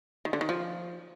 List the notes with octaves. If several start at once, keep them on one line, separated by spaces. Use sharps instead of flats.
D#3
D3
D#3
F3